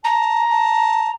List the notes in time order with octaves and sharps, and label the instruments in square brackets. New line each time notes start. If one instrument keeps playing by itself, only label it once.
[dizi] A5 [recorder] A#5
[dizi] A5